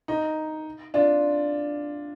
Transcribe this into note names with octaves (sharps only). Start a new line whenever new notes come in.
D#4
D4 F4